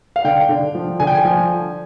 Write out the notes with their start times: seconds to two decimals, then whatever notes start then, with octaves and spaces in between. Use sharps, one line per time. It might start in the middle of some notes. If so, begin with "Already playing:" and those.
0.16 F5
0.24 D3 G5
0.49 D3
0.75 F3
1.00 D3 G#5
1.07 G5
1.15 G#5
1.25 F3